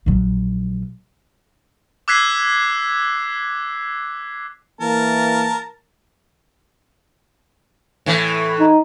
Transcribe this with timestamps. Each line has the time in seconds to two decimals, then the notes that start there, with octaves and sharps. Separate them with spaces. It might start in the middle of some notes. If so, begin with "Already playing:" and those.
0.06 A#1 F#3
2.08 D6 E6 F#6 G#6 B6 C7
4.81 E3 A#3 A#4 A5
8.06 A2 E3
8.60 D#4